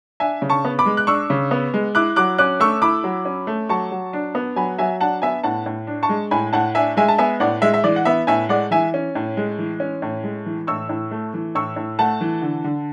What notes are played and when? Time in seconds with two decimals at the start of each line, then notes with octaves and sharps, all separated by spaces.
0.20 D4 E5 G#5
0.42 C#3
0.50 A5 C#6
0.65 B3
0.79 B5 D6
0.86 G#3
0.97 F#6
1.07 D4 C#6 E6
1.30 C#3
1.51 B3
1.74 G#3
1.95 E4 D6 F#6
2.16 F#3 D6 F#6
2.38 C#4 D6 F#6
2.60 A3 C#6 E6
2.82 E4 B5 D6
3.04 F#3
3.25 C#4
3.47 A3
3.69 F#3 A5 C#6
3.92 F#3
4.13 D4
4.35 B3
4.56 F#3 G#5 B5
4.78 F#3 E5 G#5
5.00 D4 F#5 A5
5.22 B3 E5 G#5
5.43 A2 F#5 A5
5.66 A2
5.87 D4
6.03 A5 C#6
6.09 G#3
6.31 A2 G#5 B5
6.53 A2 F#5 A5
6.75 D4 E5 G#5
6.97 G#3 E5 G#5
7.08 A5
7.18 B3 E5 G#5
7.40 A2 D5 F#5
7.62 G#3 E5
7.74 E5
7.84 E3 D5
7.96 F#5
8.05 B3 E5
8.27 A2 E5 G#5
8.49 G#3 D5 F#5
8.71 E3 E5 G#5
8.94 C#4
9.15 A2
9.37 G#3
9.58 E3
9.80 C#4
10.02 A2
10.24 G#3
10.46 E3
10.67 A2 C#6 E6
10.89 A2
11.11 A3
11.34 E3
11.55 A2 C#6 E6
11.76 A2
11.99 A3 F#5 A5
12.21 E3
12.42 D3
12.64 D3